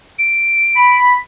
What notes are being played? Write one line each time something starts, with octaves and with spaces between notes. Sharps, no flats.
D7
B5